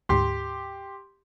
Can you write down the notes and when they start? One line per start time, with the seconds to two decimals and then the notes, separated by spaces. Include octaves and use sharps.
0.09 D2 G#2 G4 C6